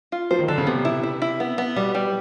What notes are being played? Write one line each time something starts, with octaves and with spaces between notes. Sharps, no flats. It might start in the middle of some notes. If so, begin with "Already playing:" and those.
F4
F3 C5
D#3
D3 A4
C#3
C3 B3
E4
E4
E4
B3
B3
B2 G3
G3